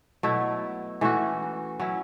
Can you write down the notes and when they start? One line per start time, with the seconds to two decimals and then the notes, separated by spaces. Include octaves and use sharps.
0.23 B2 F#3 A3 E4
1.01 E3 A3 C#4 F#4
1.80 F#3 C#4 E4